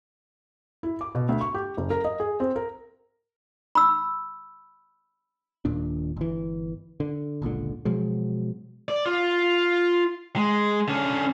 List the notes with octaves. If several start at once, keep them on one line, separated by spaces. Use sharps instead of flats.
E4
D6
B2
D2
C#6
G4
F#1
A#4
D#5
G#4
C4
A#4
B5 E6
D#1 D#2 A#2 D4
G1 E3
D3
G1 C#2 A#2 D3
B2 F3 F#3 G#3
D5
F4
G#3
D3 C#4